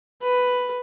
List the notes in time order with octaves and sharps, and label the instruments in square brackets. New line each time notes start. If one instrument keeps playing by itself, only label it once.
[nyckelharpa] B4